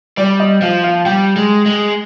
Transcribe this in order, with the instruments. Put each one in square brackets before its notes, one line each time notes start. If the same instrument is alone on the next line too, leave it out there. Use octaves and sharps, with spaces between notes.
[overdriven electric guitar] G3 [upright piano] D5
[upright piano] D#5
[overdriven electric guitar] F3 [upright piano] F5
[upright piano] F5
[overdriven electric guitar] G3 [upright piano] G5
[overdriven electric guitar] G#3
G#3